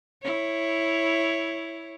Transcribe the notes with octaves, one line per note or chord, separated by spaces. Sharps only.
E4 C#5